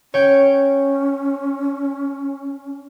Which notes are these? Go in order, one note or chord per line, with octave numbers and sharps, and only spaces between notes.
C#4 C#5 G5